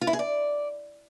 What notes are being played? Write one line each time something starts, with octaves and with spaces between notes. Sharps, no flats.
F4
E4
G#4
D5